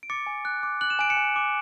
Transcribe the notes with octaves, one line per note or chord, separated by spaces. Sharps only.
D7
D6 A6 C#7
G#5
F#6
D6
F#6 F#7
E7
G#5 D7
C#7 E7
G#5
D6